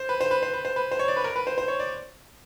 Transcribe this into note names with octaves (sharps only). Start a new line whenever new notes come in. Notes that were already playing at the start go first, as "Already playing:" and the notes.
Already playing: C5
B4
C5
B4
C5
B4
C5
B4
C5
C#5
D5
B4
A#4
B4
C5
C5
C#5
D5